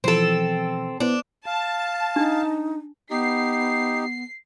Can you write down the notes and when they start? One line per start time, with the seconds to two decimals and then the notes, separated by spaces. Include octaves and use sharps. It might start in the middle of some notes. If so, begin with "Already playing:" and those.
0.04 B2 E3 F3 C4 A4
1.00 B3 D4 E4 C5
1.46 F5 A5
2.16 D4 D#4
3.11 B3 D#4 G4 C7